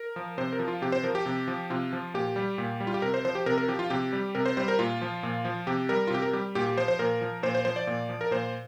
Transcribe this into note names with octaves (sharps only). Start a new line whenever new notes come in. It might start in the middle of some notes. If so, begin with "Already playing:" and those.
Already playing: A#4
F3
C3 C5
A#4
F3
F4
C3 G4
C5
F3 A#4
G4
C3
F3
C3 F4
F3
A#2 G4
G3
A#2
G3
F4
G4
C3 A#4
C5
F3 C5
G4
C3 A#4
A#4
F3 G4
F4
C3 G4
G3
C3 A#4
C5
G3 C5
A#4
A#2 F4
F3
A#2
F3
C3 G4
G3 A#4
F4
C3 G4
A#4
G3 G4
A#2 G4
G4
F3 C5
C5
A#2 A#4
F3
A#2 C5
C5
F3 C5
D5
A#2
F3
A#4
A#2 C5